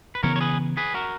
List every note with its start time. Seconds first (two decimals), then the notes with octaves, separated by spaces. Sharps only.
0.15 B4
0.23 C#3 E3 B3 A#4 C#5
0.36 C#5
0.41 G#4 B4
0.77 G#4 B4
0.94 F#4 A#4